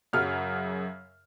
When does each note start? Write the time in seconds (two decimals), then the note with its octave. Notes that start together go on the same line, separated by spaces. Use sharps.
0.13 F#2 C#3 F#3 F6